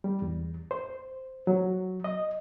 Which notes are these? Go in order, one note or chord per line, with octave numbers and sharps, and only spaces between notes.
G3
E2
C5
F#3
D#5